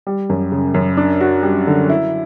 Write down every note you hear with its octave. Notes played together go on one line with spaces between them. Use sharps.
G3
F#2
C#3
F#2
D4
F#4
G3
D3
E4